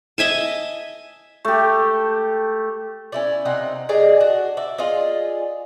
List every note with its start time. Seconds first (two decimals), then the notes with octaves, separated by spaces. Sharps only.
0.18 D#5 E5 G#5 A5
1.45 A3 G4
3.12 C#4 E4 D5
3.45 C3 D#4 F#5
3.89 G4 G#4 D5 D#5
4.20 D4 F#4
4.57 D5 E5
4.78 F4 G#4 D5 D#5